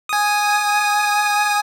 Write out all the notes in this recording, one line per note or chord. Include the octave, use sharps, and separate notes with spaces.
G#5 D#6